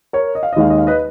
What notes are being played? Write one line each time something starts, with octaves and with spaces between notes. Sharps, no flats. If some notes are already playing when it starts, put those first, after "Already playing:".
A#4 C#5
D#5
F5
D#5
D#2 D#3 G#3 F5
D#5
F5
B4 D#5